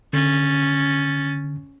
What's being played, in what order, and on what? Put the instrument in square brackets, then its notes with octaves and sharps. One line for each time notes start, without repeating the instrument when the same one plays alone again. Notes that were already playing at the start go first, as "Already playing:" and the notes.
[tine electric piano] D3 [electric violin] C#4 A6